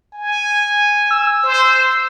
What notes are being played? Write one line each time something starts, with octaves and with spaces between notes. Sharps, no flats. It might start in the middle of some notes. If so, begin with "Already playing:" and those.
G#5
E6
C5